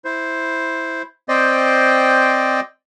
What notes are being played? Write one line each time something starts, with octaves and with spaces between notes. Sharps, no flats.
E4 C5
C4 C5 D5 D#5 G5